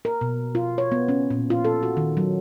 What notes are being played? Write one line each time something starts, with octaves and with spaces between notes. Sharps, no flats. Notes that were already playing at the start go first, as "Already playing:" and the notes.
A#4
B2
F4
C#5
B3
C#4
A#2
F4
A4
F#4
D#3
F#3